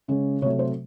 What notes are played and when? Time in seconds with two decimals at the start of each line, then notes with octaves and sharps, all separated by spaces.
0.08 C#3 G#3 C#4
0.42 C3 F#3 A3 C#5
0.59 C5